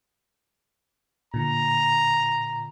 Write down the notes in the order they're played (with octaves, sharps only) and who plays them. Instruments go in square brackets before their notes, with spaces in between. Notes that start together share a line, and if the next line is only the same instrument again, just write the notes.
[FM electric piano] A#2 D3 [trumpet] A#5